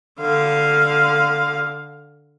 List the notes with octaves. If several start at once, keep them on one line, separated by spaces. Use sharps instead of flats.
D3 F5